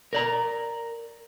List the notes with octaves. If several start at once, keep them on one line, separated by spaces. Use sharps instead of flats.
A#4 D5 A#5